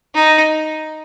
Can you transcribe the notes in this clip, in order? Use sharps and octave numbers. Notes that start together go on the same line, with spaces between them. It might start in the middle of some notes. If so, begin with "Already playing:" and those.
D#4